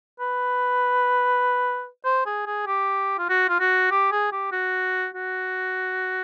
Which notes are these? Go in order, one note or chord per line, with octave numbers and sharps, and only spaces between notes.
B4
C5
G#4
G#4
G4
F4
F#4
F4
F#4
G4
G#4
G4
F#4
F#4